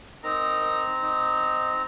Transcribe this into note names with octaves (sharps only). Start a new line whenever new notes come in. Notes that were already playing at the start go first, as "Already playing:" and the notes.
C4 D#4 A#4 A#5
D#4